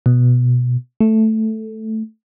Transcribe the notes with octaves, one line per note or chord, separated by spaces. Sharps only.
B2
A3